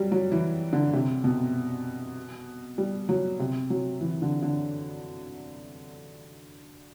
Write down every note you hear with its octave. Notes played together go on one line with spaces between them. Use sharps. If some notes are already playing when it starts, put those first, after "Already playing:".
Already playing: F#3 G3
F#3
E3
D3
C3
B2
G3
F#3
C3
F#3
E3
D3
D3